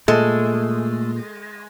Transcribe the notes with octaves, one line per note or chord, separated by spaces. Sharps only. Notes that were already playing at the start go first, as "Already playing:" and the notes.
A#2 G#3 A3 A4